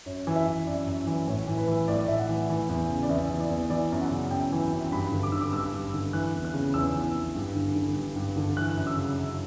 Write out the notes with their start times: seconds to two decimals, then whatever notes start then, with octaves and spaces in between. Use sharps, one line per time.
0.06 F#2 C#5
0.27 E3
0.36 E5
0.46 E3
0.67 F#2 D5
0.87 F#2
1.07 E3
1.27 A2 C#5
1.47 E3
1.57 B4
1.68 E3
1.88 A2 D5
1.99 D5
2.08 A2 E5
2.19 F#5
2.29 E3
2.49 E3
2.69 E2
2.89 C#3
3.03 D5
3.09 E2 E5
3.31 E3
3.40 D5
3.50 E2
3.70 E3 D5
3.92 F#2
4.01 F#5
4.11 C#3
4.31 F#2 G5
4.52 E3
4.72 F#2
4.92 G2 B5
5.12 D3
5.23 D6
5.32 D3 E6
5.41 D6
5.53 G2 E6
5.73 G2
5.93 D3
6.13 E3 F#6
6.35 E2
6.45 F#6
6.54 C#3
6.74 E2 E6
6.95 E3
7.15 E2
7.35 G2
7.55 D3
7.75 D3
7.96 G2
8.16 G2
8.36 D3
8.57 E3 F#6
8.77 F#2
8.87 E6
8.97 C#3
9.18 F#2